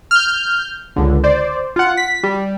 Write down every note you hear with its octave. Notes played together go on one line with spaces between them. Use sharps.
F6 G6
C#2 D3
C5 D5
F4 F#5
B6
G3